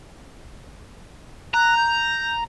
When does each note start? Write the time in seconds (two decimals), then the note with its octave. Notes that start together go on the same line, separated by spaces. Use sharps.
1.54 A#5 F#6
1.77 G6